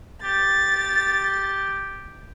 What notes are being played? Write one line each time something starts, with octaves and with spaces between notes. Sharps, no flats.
G4 A6